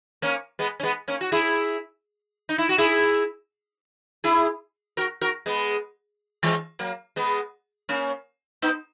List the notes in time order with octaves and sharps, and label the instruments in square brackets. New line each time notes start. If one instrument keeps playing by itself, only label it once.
[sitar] A#3 C#4
G#3 B3
C#4
G#3 B3
A#3 C#4
F#4
E4 G#4
D#4
E4
F#4
E4 G#4
E4 G#4
F#4 A#4
F#4 A#4
G#3 B3
E3 G#3
F#3 A#3
G#3 B3
A#3 C#4
B3 D#4